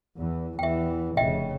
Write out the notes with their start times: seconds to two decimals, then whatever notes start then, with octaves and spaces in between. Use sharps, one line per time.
0.17 E2 E3
0.59 E2 E3 E5 G5
1.17 F1 C#3 D#5 E5 G5